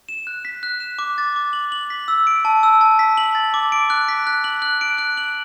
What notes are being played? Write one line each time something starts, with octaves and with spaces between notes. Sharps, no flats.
E7
F#6
B6
F#6
E7
D6
A6
D6
F#7
F#7
B6
E6
D7
A5
E6
A5
B6
F#7
A6
D6
D7
F#6
B6
F#6
F#7
F#6
D7
F#6
F#7